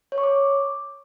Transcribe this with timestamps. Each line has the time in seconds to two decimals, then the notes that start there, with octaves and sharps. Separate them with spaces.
0.12 C#5
0.18 C#6
0.24 D6